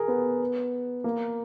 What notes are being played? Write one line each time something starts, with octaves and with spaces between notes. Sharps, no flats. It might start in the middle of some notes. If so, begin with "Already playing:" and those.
Already playing: G#4 A#4
B3
A#3